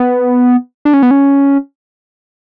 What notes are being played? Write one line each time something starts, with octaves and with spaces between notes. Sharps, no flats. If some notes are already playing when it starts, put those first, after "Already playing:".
Already playing: B3
D4
C#4
B3
C#4